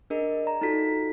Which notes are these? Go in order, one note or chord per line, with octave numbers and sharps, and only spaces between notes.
D4 G#4 A#4 D#5
D5 A#5
D#4 F4 F#4 A4 B6